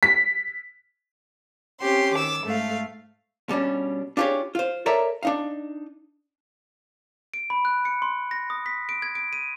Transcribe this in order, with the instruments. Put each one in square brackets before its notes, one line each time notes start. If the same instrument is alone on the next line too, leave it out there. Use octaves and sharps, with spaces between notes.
[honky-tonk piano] B6
[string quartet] C4 C#4 G4 C6
D#3 D6 E6
G#2 A3 A4 F5
[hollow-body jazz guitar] B2 G3 C#4 D4
D4 F4 G4 G#4 C#5
F4 C5
A4 A#4 C#5 D5 E5 A#5
D4 D#4 F5
[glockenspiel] D7
B5
F#6
C#7
C6
A#6
D#6
B6
D7
G#6
D7
D#7